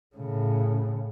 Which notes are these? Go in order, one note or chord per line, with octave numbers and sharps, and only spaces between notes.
A2 C#3